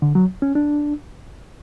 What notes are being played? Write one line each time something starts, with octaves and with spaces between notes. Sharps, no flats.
D3
F#3
C#4
D4